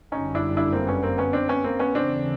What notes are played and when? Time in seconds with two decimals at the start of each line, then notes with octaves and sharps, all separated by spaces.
0.12 G1 F#2 D3 G3 C#4 D#4
0.35 D4 E4
0.57 D4 E4
0.72 A#3 C4
0.87 B3 C#4
1.03 A#3 C4
1.18 B3 C#4
1.33 C4 D4
1.48 B3 C#4
1.64 A#3 C4
1.79 B3 C#4
1.94 D#2 C#3 E3 A3 C4 D4